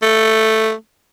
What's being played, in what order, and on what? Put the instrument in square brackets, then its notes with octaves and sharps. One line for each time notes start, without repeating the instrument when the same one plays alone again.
[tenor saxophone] A3